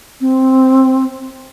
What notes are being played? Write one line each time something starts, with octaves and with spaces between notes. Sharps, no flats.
C4